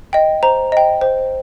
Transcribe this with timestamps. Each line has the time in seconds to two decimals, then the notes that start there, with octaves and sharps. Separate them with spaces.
0.13 D#5 G5
0.43 C5 A#5
0.72 D#5 G5
1.01 C5